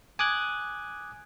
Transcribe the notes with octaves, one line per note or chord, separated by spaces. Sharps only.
G#5 D6 D#6 F#6 G#6